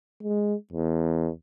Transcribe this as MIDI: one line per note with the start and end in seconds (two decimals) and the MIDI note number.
0.23 0.55 56
0.72 1.30 40